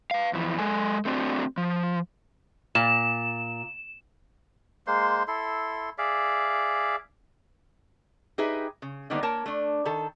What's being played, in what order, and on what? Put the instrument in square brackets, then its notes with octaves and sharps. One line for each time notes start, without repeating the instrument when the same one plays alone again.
[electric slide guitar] B4 F5
F2 E3
G#3 A4 G#5
A3 C4 D4 F#4
F3
[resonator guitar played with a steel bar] A#2 [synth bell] E7
[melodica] G#3 A#3 C5 C6
E4 A4 C6
G#4 D5 E5 F5
[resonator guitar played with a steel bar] D#4 G4 G#4 B4 E5
C#3
D3 D#3 G3 A#3 B3 D#4
A#3 A#4 C#5 A5
A3 D4
D#3 A4